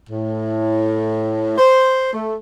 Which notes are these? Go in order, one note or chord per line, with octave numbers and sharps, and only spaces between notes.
A2
C5
A3